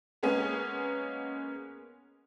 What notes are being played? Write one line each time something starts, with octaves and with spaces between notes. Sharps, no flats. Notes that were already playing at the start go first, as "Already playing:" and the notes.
G#3 A#3 B3 C#4